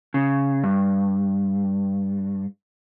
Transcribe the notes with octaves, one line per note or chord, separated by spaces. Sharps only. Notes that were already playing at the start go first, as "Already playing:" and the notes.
C#3
G2